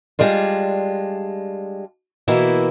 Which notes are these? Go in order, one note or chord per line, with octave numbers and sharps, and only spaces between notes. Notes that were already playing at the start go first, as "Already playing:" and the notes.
G3 G#3 D4 F4
B2 E3 A#3 E4